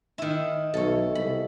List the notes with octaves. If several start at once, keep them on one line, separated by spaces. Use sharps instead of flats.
D#3 E4
B1 A4 C#5
C2 B5